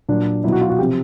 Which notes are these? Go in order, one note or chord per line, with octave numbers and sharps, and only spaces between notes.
A#2 F#3 D4
B2 F#3 E4
F#4
F4
F#4
C3 F3 G4